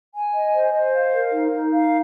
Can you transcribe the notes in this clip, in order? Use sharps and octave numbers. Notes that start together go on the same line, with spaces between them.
G#5
D#5
C5
C5
F5
A#4
D#4
D#4
F5